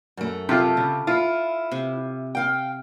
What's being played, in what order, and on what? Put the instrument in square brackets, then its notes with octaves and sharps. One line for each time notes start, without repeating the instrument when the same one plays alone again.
[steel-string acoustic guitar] F#2 A3
[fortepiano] C3 F4 [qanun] A4
[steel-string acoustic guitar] C#3
[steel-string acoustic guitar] E4 [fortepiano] F4
[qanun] C3
[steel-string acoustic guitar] F5 G5